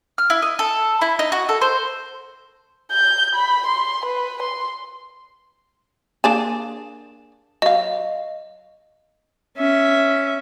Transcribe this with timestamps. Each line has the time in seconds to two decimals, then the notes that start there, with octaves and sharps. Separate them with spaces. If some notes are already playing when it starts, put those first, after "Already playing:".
0.18 F6
0.30 E4
0.42 D#5
0.59 A4
1.02 E4
1.19 D#4
1.32 F#4
1.49 A4
1.61 C5
2.92 G6
3.35 B5
3.66 C6
4.06 B4
4.42 C6
6.24 A#3 D4 G#4 E7
7.62 F#3 D#5 F5
9.57 C#4 E5